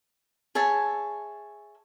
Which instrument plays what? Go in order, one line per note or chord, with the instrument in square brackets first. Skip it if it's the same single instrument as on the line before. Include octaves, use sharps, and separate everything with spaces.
[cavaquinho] G#4 C#5 E5 A5